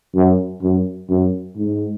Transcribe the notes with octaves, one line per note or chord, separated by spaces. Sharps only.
F#2
F#2
F#2
G#2